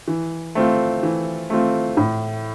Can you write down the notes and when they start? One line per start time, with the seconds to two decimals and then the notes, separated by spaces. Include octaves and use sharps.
0.08 E3
0.55 A3 C4 F4
1.03 E3
1.50 A3 C4 F4
1.97 A2